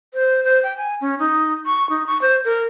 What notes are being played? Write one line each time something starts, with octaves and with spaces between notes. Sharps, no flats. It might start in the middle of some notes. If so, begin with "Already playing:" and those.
C5
C5
G5
G#5
C#4
D#4
C#6
D#4
C#6
C5
A#4